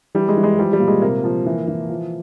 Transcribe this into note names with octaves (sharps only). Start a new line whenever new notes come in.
E3 G3
G#3
E3
G#3
F3 G3
G3
A#2
G#3
C3 A#3
F3
E3
E3
F3